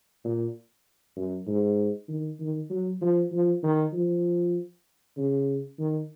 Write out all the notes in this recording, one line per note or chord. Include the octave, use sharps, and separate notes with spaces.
A#2
F#2
G#2
D#3
D#3
F#3
F3
F3
D#3
F3
C#3
D#3